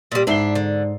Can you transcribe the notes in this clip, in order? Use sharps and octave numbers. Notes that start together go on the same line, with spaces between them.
A#2 G3
G#2 D4 E4 C7 G7
D3